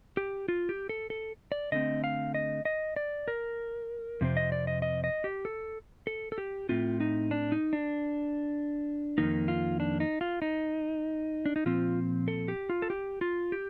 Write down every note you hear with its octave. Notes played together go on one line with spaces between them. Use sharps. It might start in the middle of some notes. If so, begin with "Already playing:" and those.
G4
F4
G4
A4
A4
D5
D3 A3 C4 D#5
F5
D#5
D#5
D5
A#4
F2 C3 C4
D#5
D5
D#5
D#5
D#5
G4
A4
A4
A4
G4
A2 A3 C4 F4
D#4
D4
D#4
D4
F2 C3 D#3 A#3 D#4
F4
D4
D#4
F4
D#4
D4
D#4
A#2 F3 C4 F4
A4
G4
F4
A4
G4
F4
G4